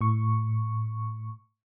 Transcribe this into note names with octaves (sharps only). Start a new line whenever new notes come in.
A2 C#6